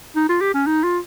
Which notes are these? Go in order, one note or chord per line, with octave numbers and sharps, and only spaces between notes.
D#4
F4
G4
C#4
D#4
F4